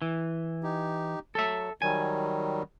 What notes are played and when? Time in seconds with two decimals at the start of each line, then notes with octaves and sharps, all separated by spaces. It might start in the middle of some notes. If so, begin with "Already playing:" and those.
0.02 E3
0.63 D#4 G4
1.35 F#3 A4 E5
1.82 D#3 F#3 G3 G#5